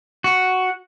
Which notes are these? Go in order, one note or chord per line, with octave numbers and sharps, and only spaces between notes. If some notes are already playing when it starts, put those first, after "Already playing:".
F#4